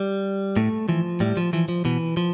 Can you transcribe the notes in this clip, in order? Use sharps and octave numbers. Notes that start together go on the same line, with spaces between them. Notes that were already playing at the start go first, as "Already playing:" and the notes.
Already playing: G3
A2 A3
E3 F3
A2 G3
F3
E3 F3
F3
B2 E3
F3